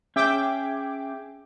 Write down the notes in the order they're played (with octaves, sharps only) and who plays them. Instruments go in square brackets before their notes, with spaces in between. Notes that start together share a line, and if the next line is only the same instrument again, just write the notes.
[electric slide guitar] C#4 G#4 [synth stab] E5 G5 D6